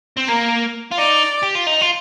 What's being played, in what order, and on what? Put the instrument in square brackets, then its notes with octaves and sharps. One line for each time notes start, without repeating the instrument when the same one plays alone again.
[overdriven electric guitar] C4
[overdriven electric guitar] A#3 [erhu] A#4
[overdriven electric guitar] F4
[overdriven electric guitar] D#4 [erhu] D5
[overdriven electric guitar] G4
F4
D#4
F4